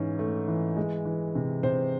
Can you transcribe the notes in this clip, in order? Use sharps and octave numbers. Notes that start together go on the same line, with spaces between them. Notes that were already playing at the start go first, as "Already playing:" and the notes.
Already playing: G#2 E3 C#4
A3
E3
G#3
E3
C3
C3 C5